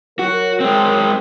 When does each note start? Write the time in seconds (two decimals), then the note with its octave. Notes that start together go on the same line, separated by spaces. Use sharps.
0.19 F#3 F#4 A#4
0.60 G#3 C4